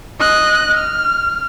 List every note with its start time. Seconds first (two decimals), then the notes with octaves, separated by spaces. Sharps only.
0.20 D#5 F#6
0.78 F6